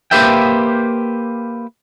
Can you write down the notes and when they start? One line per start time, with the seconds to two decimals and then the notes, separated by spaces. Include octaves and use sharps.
0.11 A#3 G4 B4 C5 E5 G5